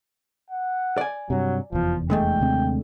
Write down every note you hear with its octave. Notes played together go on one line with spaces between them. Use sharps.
F#5
D5 G#5
G2 C3 F#3
F1 E2 F3
D3 G#3 A3 G5
D#2 C3 C4